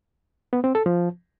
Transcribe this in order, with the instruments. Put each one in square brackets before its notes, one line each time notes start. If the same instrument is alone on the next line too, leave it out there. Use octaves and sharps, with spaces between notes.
[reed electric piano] B3
C4
A4
F3